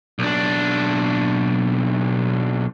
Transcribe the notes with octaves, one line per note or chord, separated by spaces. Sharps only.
B1 D4